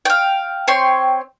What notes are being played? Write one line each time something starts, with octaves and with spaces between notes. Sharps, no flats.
F5 G5
C4 C#5 G5 C6